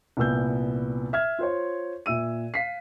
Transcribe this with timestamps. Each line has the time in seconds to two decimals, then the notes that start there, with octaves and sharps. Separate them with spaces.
0.17 C2 A#2 B3 E6 G6
1.13 E5 F6 G#6
1.39 F4 C5 C#5
2.06 A#2 E5 E6 D#7
2.54 F5 B6 C7